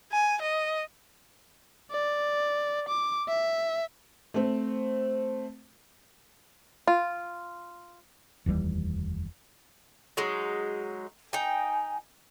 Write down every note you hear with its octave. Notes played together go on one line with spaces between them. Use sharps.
G#5
D#5
D5
D6
E5
A3 C4
F4
F1 D#2 E3 G3
F#3 G#3 D#4
D#4 G5 G#5